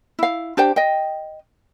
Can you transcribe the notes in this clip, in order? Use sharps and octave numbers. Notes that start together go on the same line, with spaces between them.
E4 F5
D4 G4 C5 G5
D#5 G5